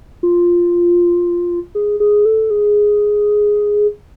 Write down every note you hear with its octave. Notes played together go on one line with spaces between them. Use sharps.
F4
G#4
G#4
A4
G#4